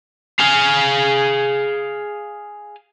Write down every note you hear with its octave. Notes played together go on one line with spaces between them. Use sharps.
G#4 F5